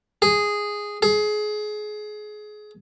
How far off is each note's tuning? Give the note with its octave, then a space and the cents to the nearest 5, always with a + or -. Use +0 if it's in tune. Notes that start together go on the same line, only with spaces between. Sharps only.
G#4 -5
G#4 +25